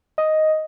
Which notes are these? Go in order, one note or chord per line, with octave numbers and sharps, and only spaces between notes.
D#5